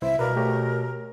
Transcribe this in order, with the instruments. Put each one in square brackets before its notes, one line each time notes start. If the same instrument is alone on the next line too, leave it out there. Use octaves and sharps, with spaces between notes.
[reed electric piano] C2 E4 C5 [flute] E5
[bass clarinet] B2 [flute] A#4 [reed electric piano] B4 D5 F5
[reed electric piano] A3 G4 C#5